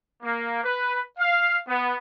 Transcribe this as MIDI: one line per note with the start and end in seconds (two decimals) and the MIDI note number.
0.22 0.59 58
0.64 1.01 71
1.18 1.57 77
1.67 1.96 59